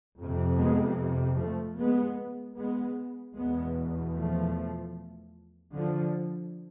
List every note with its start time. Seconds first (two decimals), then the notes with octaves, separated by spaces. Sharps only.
0.19 F2 C3
0.58 G#3 B3
1.38 F3 A3
1.77 G#3 B3
2.57 G#3 B3
3.36 E2 B2 G#3 B3
4.15 F3 A3
5.74 D3 F3